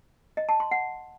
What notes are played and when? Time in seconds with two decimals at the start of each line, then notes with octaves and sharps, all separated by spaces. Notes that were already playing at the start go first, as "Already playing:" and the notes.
0.37 D#5
0.49 A5
0.60 C6
0.71 F#5